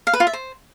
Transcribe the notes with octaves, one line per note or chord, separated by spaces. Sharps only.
F5
B4
F4
E5
C5